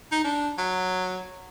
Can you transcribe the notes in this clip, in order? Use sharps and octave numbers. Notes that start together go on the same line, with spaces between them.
D#4
D4
F#3